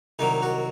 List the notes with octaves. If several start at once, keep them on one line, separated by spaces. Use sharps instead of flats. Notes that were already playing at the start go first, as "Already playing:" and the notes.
C2 C3 D#3 F#3 D#4
F#4